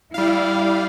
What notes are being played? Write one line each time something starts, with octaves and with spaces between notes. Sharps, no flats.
G3 E4 F5